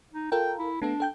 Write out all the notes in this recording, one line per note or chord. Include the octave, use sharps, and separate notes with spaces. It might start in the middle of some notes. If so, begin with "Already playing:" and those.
D#4
F4 A4 A#4 G5
E4
A3 B3 D4 A4
A4 G5 G6